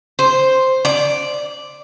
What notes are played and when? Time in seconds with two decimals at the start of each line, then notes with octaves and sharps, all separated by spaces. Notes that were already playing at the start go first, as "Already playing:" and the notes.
0.19 C5
0.85 D5